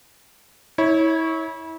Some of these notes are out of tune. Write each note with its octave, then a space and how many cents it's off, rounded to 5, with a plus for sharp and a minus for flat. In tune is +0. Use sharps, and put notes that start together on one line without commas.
E4 -30 C#5 +0